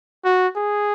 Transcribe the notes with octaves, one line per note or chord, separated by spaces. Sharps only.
F#4
G#4